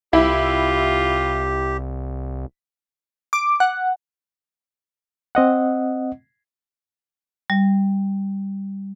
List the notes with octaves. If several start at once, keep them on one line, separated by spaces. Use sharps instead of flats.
C2 E4 F4 G4
D6
F#5
C4 D#5 F#5
G3